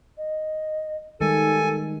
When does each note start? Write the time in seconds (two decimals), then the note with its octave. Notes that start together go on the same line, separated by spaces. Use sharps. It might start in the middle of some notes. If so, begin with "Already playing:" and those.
0.18 D#5
1.21 D#3 G3 G#3 D#4 A4 G#5